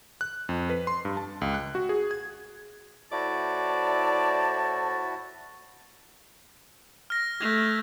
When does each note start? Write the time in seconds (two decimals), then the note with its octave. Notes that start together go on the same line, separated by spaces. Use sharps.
0.21 F#6
0.49 F2
0.70 B4
0.87 C6
1.05 G2
1.17 A5
1.41 C#2
1.54 F#6
1.75 F#4
1.89 G#4
2.11 G#6
3.12 A2 E4 F#4 C5 D5 A5
7.10 F6 A#6
7.41 A3 G#6